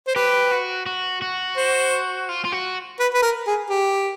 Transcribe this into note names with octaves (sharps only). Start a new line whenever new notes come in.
C5
G4 B4
F#4
F#4
F#4
C5
F4
F4
F#4
B4
B4
A#4
G#4
G4